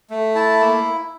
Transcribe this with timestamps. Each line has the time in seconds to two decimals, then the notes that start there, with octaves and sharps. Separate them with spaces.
0.10 A3
0.35 E4 A5
0.60 A#3